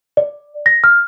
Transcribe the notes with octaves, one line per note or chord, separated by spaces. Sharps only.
D5
A#6
F6